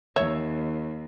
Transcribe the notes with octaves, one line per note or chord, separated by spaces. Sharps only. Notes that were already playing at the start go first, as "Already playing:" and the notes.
D#2 C#5 E5